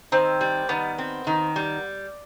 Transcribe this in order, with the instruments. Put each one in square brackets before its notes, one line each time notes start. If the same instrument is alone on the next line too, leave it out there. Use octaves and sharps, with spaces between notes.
[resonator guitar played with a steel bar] D#3 [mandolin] C4
[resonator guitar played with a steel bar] G3
[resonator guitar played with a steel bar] D#3 [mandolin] B3
[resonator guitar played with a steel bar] C4
D#3
G3